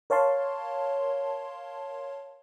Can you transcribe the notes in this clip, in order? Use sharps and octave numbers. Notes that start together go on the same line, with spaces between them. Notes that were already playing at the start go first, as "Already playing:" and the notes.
A#4 C#5 F5 A5 C6